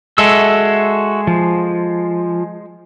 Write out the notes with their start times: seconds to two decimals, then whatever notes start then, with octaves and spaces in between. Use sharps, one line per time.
0.18 G#3 F#4 A4 E5 E6
1.27 F3